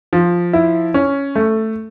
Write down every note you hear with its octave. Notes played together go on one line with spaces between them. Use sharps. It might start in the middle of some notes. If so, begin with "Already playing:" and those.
F3
E4
C#4
A3